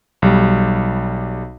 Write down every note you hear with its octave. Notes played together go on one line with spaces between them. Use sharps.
B1 G3